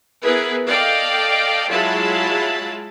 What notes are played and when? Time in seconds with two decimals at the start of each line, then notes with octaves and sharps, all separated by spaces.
0.24 B3 E4 G#4 A#4 B4
0.68 A4 D5 D#5 F5 G5
1.69 F#3 G#3 E4 F4 A5 B5